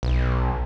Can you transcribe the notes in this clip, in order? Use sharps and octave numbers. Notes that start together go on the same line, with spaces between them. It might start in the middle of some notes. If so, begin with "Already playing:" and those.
B1